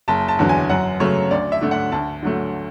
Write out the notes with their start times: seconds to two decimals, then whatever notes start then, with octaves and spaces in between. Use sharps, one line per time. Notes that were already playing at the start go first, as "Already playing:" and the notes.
0.08 F#1 A5
0.28 A5
0.39 E2 D3 F#3
0.49 G#5
0.69 F#2 F#5
1.00 C#3 F#3 A3 C#5
1.31 D2 D5
1.52 E5
1.62 D3 A3
1.71 F#5
1.92 D2 A5
2.23 D3 F#3 A3